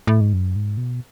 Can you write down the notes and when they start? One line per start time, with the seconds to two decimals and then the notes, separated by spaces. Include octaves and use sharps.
0.07 A2
0.21 G#2
0.33 F#2
0.56 G#2
0.77 B2